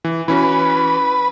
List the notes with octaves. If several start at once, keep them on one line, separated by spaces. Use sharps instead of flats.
E3
E3 C#4 F#4 B4